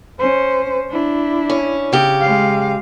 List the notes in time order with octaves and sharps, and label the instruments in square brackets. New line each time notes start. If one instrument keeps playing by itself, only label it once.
[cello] C#4 C5
D4 E4
[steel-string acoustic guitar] C#4
C#3 G4
[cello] G#3 F5